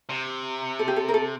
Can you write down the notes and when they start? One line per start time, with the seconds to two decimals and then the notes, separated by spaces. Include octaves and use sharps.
0.09 C3
0.79 A4
0.88 G4
0.96 A4
1.08 A#4
1.14 A4